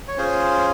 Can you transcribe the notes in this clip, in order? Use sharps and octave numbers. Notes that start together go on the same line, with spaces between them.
C#5
C#4 F4 G#4 C5